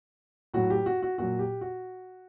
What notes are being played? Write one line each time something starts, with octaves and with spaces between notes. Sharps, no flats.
A2 F#3 F#4
G4
F#4
F#4
A#2 F#3 F#4
G4
F#4